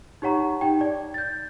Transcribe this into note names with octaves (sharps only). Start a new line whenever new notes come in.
D#4 G4 C#5 F#5 A#5 C#6
D#4 G4 G5
D5
G6 A6